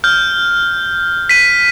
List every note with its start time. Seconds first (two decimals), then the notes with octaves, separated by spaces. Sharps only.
0.04 F6 G6
1.29 B6 D#7